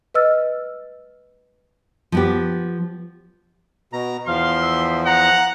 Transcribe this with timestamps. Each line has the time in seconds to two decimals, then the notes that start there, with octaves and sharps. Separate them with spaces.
0.14 B4 D#5 E6 F6 A6
2.12 F3 B3 G4
3.93 B2 A#5
4.27 E2 F3 F5 C6
4.62 E5
5.06 F#5 A#5